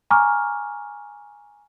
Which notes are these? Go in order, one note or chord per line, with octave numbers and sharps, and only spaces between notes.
G#5 A#5 C#6 D6 F6